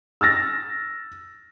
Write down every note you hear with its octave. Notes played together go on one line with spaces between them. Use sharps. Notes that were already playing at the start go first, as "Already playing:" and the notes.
E6 F6 A6 A#6